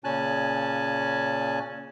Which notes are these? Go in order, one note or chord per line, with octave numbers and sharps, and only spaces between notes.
A#2 C#3 C#4 G#5 A5 F#6